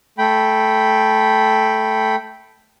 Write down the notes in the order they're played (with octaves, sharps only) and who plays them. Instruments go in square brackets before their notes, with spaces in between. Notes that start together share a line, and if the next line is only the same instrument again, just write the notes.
[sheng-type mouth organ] A3 G5 B5